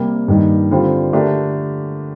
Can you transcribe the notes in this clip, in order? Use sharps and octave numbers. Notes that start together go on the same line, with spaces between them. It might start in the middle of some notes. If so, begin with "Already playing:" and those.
Already playing: C3 G3 A#3
G2 D#3 G3 A#3 D#4
D3 G3 C4 F4 C5
D3 A3 D4 G4 A#4